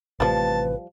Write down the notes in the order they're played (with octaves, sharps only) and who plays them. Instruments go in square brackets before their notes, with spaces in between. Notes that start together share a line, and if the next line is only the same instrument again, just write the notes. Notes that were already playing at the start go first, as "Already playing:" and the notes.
[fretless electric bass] A1 A2 C3 [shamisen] F3 G3 [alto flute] B4 [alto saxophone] A5